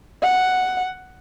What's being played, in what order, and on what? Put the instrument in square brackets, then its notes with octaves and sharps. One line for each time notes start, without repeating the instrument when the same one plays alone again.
[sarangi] F#5